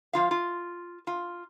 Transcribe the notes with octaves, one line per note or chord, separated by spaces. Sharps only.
F3 F4 F5
F4
F4